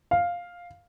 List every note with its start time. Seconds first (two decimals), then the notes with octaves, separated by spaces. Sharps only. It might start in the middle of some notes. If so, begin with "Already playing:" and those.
0.11 F5